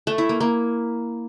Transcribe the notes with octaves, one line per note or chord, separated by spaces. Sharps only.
A3
E4
A#3
A#3